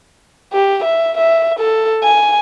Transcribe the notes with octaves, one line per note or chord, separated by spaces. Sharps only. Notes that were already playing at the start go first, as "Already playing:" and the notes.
G4
E5
E5
A4
G#5